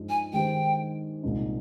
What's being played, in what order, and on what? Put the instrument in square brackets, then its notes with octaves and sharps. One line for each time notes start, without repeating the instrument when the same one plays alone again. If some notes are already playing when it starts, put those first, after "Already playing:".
Already playing: [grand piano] G2 F3 G#3 D#4
[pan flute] G#5
[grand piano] D#3 G#3 D#4 G4 C5 [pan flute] G5
[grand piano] C2 A#2 G#3 D#4